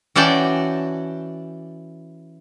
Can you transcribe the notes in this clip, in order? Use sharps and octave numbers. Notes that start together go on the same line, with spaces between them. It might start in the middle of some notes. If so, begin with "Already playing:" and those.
E3 C#4 F#4 D5 G5 A5